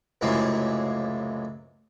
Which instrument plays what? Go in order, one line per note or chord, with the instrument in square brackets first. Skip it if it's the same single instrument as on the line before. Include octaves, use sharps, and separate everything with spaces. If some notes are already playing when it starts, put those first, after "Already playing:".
[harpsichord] C#2 F#2 A2 C3 G#3 A#3